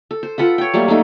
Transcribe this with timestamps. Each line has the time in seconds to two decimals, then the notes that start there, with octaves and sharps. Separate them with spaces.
0.11 A4
0.23 C5
0.38 F4 A4 B4 F#5
0.58 C#5 G5
0.74 F#3 G3 A3 A#3
0.88 A3 A#3 D#4 A4